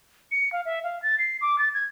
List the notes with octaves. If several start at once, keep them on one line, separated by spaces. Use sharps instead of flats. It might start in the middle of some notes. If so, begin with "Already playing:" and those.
C#7
F5
E5
F5
A6
C7
D6
A6
G#6